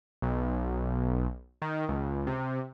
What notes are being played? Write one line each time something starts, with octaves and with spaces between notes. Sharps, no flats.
B1
D#3
C#2
C3